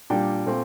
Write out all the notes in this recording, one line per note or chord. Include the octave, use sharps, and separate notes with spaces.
A#2 G3 D4 G5
A#2 A3 C4